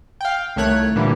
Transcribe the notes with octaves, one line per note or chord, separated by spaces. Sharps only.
F5 G5
C2 D#3 A3 C#5 F#6 G#6
A#2 D3 E3 G3